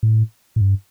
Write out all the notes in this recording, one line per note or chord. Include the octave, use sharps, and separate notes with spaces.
A2
A2
G2